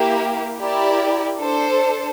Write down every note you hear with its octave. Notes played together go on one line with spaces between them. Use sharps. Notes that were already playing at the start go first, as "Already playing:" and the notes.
Already playing: A#3 E4 G4 A#4
E4 G4 A#4 D5
D4 A4 C5